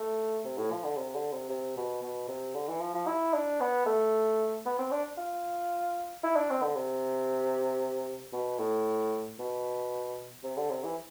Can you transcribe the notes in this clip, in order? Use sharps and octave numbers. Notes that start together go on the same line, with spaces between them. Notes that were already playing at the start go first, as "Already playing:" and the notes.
Already playing: A3
C3
A2
F3
D3
C3
D3
C3
C3
B2
B2
C3
D3
E3
F3
F3
E4
D4
B3
A3
B3
C4
D4
F4
E4
D4
C4
D3
C3
B2
A2
B2
C3
D3
C3
E3